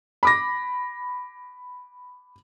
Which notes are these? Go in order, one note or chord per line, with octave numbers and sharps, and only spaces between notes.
B5 D6 A#6